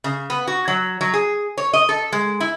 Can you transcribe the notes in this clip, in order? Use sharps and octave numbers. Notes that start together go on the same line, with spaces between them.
C#3
B3
F#4
F#3
F#3
G#4
C#5
D#5
A4
G#3
E4